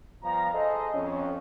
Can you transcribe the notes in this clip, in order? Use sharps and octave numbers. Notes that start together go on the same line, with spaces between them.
F3 G3 B3 F5 A#5
G#4 A4 C5 D#5
F2 C#4